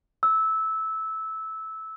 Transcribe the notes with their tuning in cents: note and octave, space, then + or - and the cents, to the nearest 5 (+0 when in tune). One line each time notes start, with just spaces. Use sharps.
E6 -15